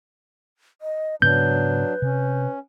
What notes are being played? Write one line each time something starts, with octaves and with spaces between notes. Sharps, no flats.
D#5
G#2 C#3 F#3 B3 D4 B4 G6
C3 C#4